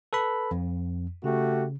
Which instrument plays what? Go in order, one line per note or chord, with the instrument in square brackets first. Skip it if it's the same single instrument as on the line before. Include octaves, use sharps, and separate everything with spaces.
[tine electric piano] A4 B4 B5
F2
[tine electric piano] C#3 [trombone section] A3 F#4 G4